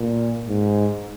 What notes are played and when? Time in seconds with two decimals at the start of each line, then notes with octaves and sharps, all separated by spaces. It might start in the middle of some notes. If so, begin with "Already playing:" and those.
Already playing: A#2
0.47 G#2